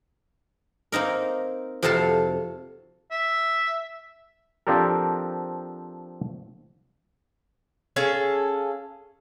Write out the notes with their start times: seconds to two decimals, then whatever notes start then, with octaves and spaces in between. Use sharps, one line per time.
0.92 A#3 C4 D#4 A#4
1.82 F2 C3 F#4 A4 F5 A5
3.11 E5
4.67 F3 C4 D4 G4 A4 A#4
7.96 C#4 G#4 A4 F5